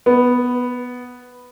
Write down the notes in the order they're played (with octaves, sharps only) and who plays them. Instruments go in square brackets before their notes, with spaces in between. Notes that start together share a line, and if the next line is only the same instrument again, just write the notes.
[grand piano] B3